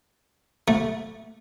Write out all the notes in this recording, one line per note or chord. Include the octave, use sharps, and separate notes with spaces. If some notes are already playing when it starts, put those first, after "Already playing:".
A3